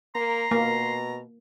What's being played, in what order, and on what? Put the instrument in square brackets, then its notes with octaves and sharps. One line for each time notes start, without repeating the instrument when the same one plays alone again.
[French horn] A#3 [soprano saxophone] A#5 [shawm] C6
[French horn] B2 [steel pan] A#3